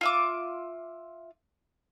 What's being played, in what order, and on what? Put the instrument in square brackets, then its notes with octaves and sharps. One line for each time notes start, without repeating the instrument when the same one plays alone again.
[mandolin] F4 E5 D6